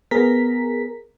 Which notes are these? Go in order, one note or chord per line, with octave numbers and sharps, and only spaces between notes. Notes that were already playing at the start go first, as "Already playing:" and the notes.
B3 G#4 A#4 A#5 B6